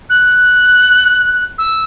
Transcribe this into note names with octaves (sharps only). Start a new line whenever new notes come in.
F#6
E6